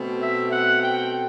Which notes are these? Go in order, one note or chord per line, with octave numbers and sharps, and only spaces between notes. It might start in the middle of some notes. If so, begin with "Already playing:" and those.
Already playing: B2 A3 C4
E5
F#5
G5